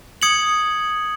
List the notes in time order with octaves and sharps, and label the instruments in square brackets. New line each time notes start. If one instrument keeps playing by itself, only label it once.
[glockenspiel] D#6 G#6 C#7 F#7